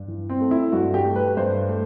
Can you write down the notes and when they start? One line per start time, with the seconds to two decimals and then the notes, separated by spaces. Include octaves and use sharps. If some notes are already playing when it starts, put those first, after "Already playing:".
Already playing: G2
0.08 E3
0.30 C4
0.41 A3
0.51 E4
0.72 G2 F#4
0.94 G4
1.04 A3
1.16 B4
1.37 G2 C5
1.69 A3